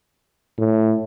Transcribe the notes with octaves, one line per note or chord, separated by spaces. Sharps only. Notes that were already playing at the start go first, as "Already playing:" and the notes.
A2